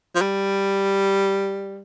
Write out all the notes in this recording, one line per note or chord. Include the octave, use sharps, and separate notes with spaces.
F3
G3